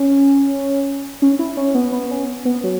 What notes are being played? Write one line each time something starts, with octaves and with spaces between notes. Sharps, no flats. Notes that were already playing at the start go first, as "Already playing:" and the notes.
Already playing: C#4
C#4
E4
C#4
B3
B3
C#4
B3
F#3